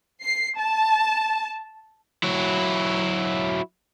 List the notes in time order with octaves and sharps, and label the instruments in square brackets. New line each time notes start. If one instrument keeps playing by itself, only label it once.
[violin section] C7
A5
[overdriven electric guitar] F#3 E4